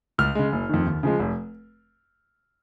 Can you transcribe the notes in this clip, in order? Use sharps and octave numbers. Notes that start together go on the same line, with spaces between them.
C#2 F6
C#3 G#3
F#1
F2 D#3
D#2
C#3 F3 G#3
F1